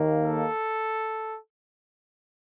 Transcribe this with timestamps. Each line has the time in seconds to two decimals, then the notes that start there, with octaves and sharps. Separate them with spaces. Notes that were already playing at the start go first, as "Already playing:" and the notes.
Already playing: D#2 D#3 A#3
0.22 A4